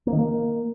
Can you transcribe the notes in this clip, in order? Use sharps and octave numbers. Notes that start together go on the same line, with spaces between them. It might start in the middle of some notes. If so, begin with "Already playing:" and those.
A#3
D#3
A#3